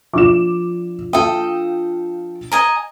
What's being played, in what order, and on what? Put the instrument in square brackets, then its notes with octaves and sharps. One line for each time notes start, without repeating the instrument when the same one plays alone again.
[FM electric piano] F3 D4 F4 [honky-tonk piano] D6 E7
[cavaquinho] A4 D#5 [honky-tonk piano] F5 G5
[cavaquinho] D#5 G#5 A#5